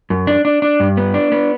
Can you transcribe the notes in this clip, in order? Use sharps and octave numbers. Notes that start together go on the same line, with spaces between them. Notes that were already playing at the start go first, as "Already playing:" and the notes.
F#2
D4
D4
D4
G2
B3
D4
B3